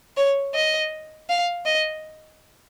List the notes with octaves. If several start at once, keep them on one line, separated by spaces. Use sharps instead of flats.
C#5
D#5
F5
D#5